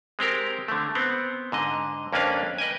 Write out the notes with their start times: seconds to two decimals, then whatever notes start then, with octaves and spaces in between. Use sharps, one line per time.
0.19 G#3 C4 G4 A#4
0.68 D3 A3
0.95 B3 C4
1.52 G#2 D3 D#5
2.13 F2 A#3 C#4 D4 B4 F5
2.58 B4 D#5 G5 G#5